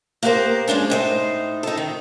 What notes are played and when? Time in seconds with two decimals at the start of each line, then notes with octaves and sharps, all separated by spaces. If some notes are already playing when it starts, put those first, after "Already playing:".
0.23 A#3 B3 G4 A#4 C5
0.68 G#3 C#4 D4 G#4
0.90 A2 D#4 C5
1.63 D#4 A4
1.77 D#3